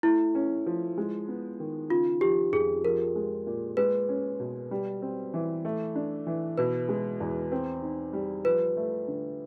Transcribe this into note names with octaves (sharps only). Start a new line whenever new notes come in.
A3 E4
C#4
F3
G#3
B3
D#3
C#3 F4
F3 G4
F2 G#4
F3 A#4
G#3
A#2
G#3 B4
C#4
B2
G3
C4
E3
A3
D4
E3
B2 B4
G#3
E2
C4
D#4
G3
F3 B4
A3
D3